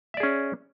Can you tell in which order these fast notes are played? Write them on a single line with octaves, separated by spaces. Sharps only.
E5 D5 G#4 C#4